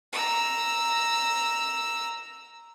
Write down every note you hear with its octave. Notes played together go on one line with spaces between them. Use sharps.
A#5 E6